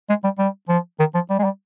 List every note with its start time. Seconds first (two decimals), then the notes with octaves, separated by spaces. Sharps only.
0.09 G#3
0.24 G3
0.39 G3
0.69 F3
1.00 D#3
1.15 F3
1.30 G3
1.39 G#3
1.44 G3